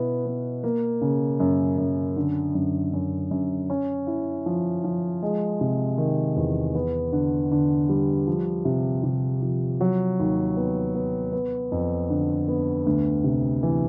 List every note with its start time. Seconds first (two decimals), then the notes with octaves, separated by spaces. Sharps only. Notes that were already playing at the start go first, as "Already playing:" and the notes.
Already playing: B2 B3 E4
0.26 B3
0.64 A#3
1.01 C#3
1.40 F#2
1.78 F#2
2.17 D3
2.55 F#2
2.93 F#2
3.31 F#2
3.70 C#4
4.07 E4
4.46 F3
4.84 F3
5.23 G#3
5.61 C3
5.98 D#3
6.36 E2
6.75 B3
7.12 D3
7.51 D3
7.89 G3
8.28 F3
8.65 C3
9.04 C3
9.42 F3
9.81 F#3
10.19 D#2
10.57 B3
10.95 B3
11.32 B3
11.72 F2
12.10 D3
12.48 B3
12.86 D2
13.24 C3
13.63 E3